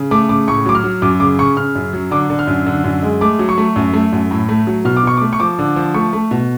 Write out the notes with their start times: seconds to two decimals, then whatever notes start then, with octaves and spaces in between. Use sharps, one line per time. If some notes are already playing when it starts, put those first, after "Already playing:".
Already playing: C#3
0.11 A3 D6
0.29 C#3 D6
0.48 A2 C#6
0.66 F#3 D6
0.75 F6
0.84 F#3
1.02 F#2 D6
1.20 C#3 D6
1.39 C#3 C#6
1.57 C#3 F6
1.75 F#2
1.93 F#3
2.11 D3 D6
2.30 D3
2.39 F6
2.47 F#2
2.66 D3
2.84 F#2
3.03 G#3
3.21 A3 D6
3.39 F#3
3.49 C#6
3.58 A3
3.76 F#2
3.94 A3
4.13 F#2
4.31 A2
4.49 A3
4.67 F#3
4.85 B2 F6
4.97 D6
5.03 B2 C#6
5.17 A3 D6
5.33 C#6
5.40 F3 D6
5.59 D3
5.76 F3
5.94 A3 C#6
6.13 A3
6.31 B2